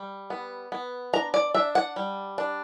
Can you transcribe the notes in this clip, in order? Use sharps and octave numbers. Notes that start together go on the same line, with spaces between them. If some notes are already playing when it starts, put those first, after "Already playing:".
Already playing: G3
B3
B3
D4 A#5
D5
D4 E5
F#5
G3
D4